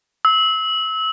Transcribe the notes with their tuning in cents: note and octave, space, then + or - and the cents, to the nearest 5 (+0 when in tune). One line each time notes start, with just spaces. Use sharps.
E6 -25